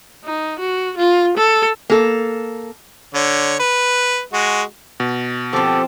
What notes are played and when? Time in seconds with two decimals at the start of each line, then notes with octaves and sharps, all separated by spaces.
0.24 D#4
0.59 F#4
0.97 F4
1.37 A4
1.90 A#3 A4
3.14 D3 C#5
3.60 B4
4.33 G#3 F#4
5.00 B2
5.53 F3 C4 G4 A4